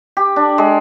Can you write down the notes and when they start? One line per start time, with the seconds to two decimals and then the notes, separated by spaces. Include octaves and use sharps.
0.17 G4
0.36 D4
0.58 G#3